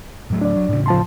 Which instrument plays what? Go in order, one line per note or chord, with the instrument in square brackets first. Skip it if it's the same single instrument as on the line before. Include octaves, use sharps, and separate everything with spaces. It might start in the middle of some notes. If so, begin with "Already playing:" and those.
[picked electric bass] A2 F#3 A3
[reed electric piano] D4 D5
[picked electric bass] F#3
A2 C#3
[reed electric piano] F3 A5 C6